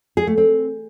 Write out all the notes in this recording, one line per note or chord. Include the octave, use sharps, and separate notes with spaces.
G#4
A3
C4